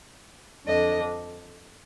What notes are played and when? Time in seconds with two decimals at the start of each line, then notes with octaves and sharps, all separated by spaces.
0.67 F2 D3 D#5